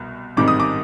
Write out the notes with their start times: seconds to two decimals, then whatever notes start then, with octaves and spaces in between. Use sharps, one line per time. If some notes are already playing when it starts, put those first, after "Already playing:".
Already playing: C2 B2
0.37 A1 G#2 D#3 G3 C4 D6
0.48 D#6
0.60 D6